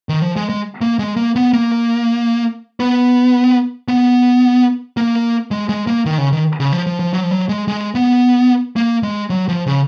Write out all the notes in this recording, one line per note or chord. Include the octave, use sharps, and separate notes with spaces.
D#3
F3
G#3
G#3
A#3
G#3
A#3
B3
A#3
B3
B3
A#3
G#3
G#3
A#3
D#3
C#3
D#3
C#3
F3
F3
F3
F#3
F3
F#3
G#3
G#3
B3
A#3
G#3
F#3
F3
C#3